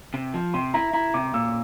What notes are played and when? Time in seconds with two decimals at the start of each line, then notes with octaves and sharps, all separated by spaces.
0.14 C3
0.34 F3
0.54 C3 C6
0.74 E4 A#5
0.93 E4 A#5
1.14 C3 D6
1.34 A#2 E6